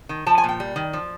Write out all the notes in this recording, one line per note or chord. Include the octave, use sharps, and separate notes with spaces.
D#3
F3 A5
G#5
A#2 G5
G3
D#3
F3